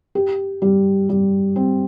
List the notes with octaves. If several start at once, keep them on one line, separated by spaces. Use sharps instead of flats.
G4
G3
G3
C4